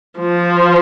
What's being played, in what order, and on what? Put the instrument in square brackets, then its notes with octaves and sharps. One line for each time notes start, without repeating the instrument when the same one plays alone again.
[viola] F3